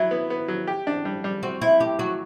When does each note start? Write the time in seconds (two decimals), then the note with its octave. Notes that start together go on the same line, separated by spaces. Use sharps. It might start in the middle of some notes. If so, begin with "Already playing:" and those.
Already playing: F#3 E4
0.11 B3
0.30 B3
0.48 F#3
0.67 G4
0.87 D4
1.05 G3
1.24 G3
1.43 C4 F#4
1.61 C4 E4
1.80 A2 G4
1.99 F#3 F#4